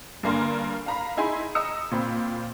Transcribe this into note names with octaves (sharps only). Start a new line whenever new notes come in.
G2 D3 A#3 A#4 G#5 C6
F5 A#5 B5
D#4 E4 G#4 G#5 B5 C6
D#5 A#5 D#6 E6 C#7
A#2 C4 B5